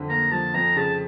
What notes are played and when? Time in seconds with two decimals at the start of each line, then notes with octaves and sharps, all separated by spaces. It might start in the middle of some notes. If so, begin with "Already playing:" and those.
Already playing: F2 D3
0.09 A#3 A#5
0.32 F3 A5
0.54 F2 A#5
0.76 C#3 A5